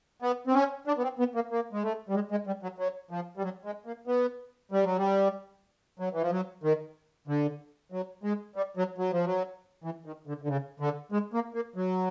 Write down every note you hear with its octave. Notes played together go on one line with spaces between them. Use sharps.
B3
C4
C#4
D4
B3
C4
B3
A#3
A#3
G#3
A3
G3
G#3
G#3
G3
F#3
F#3
F3
G3
F#3
G#3
A#3
B3
G3
F#3
G3
F#3
E3
F3
F#3
D#3
D3
F#3
G#3
G3
F#3
F#3
F3
F#3
E3
D#3
D3
D3
C#3
D3
G#3
A#3
A#3
F#3